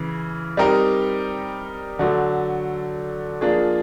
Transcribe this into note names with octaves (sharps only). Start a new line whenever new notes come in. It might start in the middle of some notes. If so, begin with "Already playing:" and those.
Already playing: C#3 E3
G3 C4 D#4 G4 A#4
D3 F#3 A3
F3 A#3 D4 F4 G#4